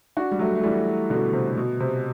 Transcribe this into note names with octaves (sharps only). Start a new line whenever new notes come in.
D4 F#4
G3
F#3 A3
A3
E3 G3
B2 D3
C3
B2
C3